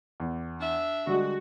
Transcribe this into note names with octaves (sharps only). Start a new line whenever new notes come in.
E2
D4 E5
D3 G3 G#3 F#4